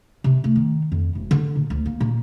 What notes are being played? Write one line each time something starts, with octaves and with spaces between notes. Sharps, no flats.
C3
A3
D#3
F2
E1
D3
A#2
D2
A#3
A#2